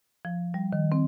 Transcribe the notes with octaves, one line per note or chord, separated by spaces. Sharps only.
F3
G3
D#3
C4